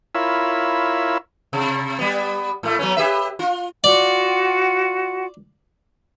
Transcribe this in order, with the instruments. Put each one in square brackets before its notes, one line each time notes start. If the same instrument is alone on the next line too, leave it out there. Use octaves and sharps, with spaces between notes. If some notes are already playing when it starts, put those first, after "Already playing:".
[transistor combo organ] E4 F4 A#4 C#5 B5 E6
[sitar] C3
G3 B3
A2 A3
F#3 B3 C#4
G4 B4 E5
F4
[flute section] F4 F#4 F#5 [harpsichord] D5